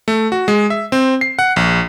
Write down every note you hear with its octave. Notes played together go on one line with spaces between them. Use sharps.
A3
F#4
G#3
E5
C4
C7
F#5
A#1